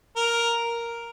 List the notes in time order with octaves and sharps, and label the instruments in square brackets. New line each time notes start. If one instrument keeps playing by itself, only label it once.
[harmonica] A#4